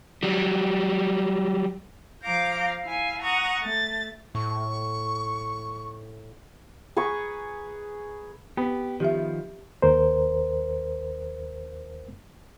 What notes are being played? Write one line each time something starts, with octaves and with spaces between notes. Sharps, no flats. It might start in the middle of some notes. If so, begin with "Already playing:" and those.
F#3 G3
F3 F5 A#5 D6 G6
E4 F5 G#5
F#5 A#5 C#6 D#6
A3 A6
A2 C#6
G#4 B4 A#5 C#6
B3 G4
D#3 F3 G4 E5
D#2 A#4 C5